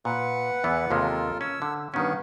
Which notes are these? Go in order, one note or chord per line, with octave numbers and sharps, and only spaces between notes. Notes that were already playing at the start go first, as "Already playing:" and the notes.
A#2 B4 F#5
E2 E3 B3
D#2 C3 G#3 F4 A4 A#4
C#4 E6
D3
G2 D#3 B3 C#4